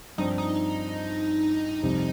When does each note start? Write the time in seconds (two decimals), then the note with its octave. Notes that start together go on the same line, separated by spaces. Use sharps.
0.18 G2 F3 C4 D#4
0.38 D#4
1.82 F2 C3 G3 C4 G4